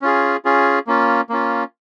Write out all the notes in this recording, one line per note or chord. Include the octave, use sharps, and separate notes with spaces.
C#4 F4 G#4
C#4 F4 G#4
A#3 C#4 F4
A#3 C#4 F4